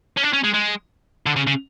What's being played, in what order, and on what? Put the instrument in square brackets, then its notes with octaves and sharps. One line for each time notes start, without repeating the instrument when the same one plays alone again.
[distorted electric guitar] C#4
D4
C#4
G#3
G#3
D3
C#3
C#3